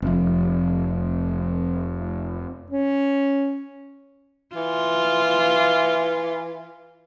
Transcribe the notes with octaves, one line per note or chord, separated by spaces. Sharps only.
F1 F3
C#4
E3 F4